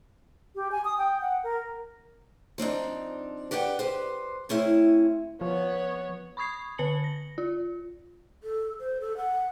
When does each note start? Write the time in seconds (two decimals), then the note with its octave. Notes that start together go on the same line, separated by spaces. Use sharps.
0.55 G4
0.72 G#5
0.85 D#6
0.98 G5
1.21 F#5
1.44 A#4
2.58 F3 C4 D4 D#4
3.51 G4 B4 D5 F#5 G5
3.79 G4 B4 C5
4.49 A3 C4 C#4 E4
5.41 F3 B3 C#5
6.37 B5 C#6 D#6 G#6 C7
6.78 D3 B4 A5 B5 C#7 F#7
7.04 A#6
7.38 F4
8.43 A4
8.80 C5
9.01 A4
9.17 F#5